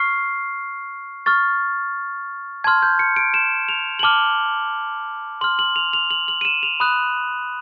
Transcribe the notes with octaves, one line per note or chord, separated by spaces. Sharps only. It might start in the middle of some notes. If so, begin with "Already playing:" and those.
Already playing: C#6 F6 C7
C#6 F6 A6
A5 C6 F6 G#6
G6
C#7
D7
E7
F7
F#7
A5 D6 F6 G7
C6 F6 F#7
F#7
F7
F7
F#7
F#7
D#7
E7
F7
B5 D#6 F#6